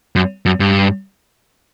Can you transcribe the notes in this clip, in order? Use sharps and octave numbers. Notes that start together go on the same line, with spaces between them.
F#2
F#2
G2